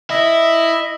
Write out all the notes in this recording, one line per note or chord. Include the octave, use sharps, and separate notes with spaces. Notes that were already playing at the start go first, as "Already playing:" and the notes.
E4 D#5 E5